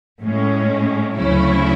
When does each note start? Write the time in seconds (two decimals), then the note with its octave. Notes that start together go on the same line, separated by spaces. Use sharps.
0.21 A2 G#3 C#4
1.16 D2 C#3 F#3 C#4 E4